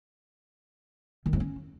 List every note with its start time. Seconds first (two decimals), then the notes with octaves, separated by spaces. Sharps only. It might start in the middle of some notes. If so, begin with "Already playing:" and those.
1.26 D#3
1.33 G2
1.40 C#4